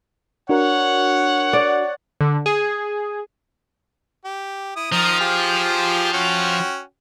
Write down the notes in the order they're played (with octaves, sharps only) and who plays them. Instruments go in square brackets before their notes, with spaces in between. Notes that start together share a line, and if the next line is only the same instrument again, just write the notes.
[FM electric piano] D4 F#4 A#4 [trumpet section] C#5 F#5
[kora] D5
[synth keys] D3
G#4
[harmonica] G4
E4 D#6
[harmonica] D#3 A#5 D#6 [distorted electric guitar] F3
[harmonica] F4 G4 G#4
C#4 F#4 G5